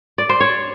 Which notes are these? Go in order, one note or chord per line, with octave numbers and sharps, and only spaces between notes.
D5
C5
C#5